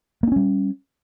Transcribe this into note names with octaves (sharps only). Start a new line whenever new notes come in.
G3 A#3 C#4 D4